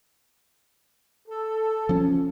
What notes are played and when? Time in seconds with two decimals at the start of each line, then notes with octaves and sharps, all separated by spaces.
1.28 A4
1.89 F3 C#4